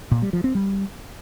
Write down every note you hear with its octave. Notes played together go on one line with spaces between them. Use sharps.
A#2
G3
F3
C4
G3